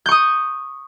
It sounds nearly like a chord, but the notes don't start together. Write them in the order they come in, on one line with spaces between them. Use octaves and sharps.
G6 C#6 D#6